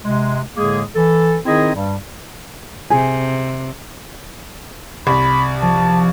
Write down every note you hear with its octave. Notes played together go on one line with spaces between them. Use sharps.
C3 G#3
A2 D3 G#3 A#3 G#4
E3 A4
D#3 C4 D#4 E4 G#4 D#5
G2 G3
C3 G#4
C2 B5
F3 A5